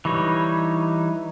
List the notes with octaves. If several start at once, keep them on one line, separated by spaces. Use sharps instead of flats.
E3 G3 D#4 C#5